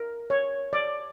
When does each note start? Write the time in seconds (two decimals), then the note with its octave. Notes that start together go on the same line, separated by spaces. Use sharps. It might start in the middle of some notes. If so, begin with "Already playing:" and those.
Already playing: A#4
0.30 C#5
0.73 D5